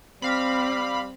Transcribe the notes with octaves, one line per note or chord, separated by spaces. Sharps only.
G3 C4 F5 B5